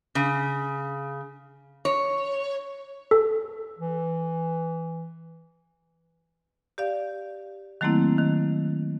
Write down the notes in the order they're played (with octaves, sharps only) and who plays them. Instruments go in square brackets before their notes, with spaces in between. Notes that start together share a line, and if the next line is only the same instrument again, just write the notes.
[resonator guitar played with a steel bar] C#3
C#5
[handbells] A4
[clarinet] E3
[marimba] G4 D5 F5
D#3 F#3 A3 A#3 C4 E4
D#3